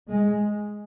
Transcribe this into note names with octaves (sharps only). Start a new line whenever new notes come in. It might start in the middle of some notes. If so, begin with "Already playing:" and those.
G#3